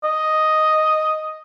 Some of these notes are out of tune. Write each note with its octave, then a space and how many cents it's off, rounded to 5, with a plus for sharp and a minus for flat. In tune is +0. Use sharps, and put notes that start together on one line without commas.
D#5 +0